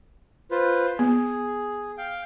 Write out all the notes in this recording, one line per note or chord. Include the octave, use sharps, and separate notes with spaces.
F4 B4 C5
B3 G#4
F5 G5